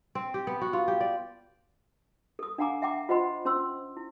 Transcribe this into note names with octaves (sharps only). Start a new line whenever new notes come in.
C4
G4
B3
F#4
F4
G4
D5
A4 D#6
D4 F5 F#5 G#5 A#5 D6
E5 F#5 G5 A#5 D6
F4 C5 D#5 F#5 B5 C6
C#4 C5 C6 E6
E4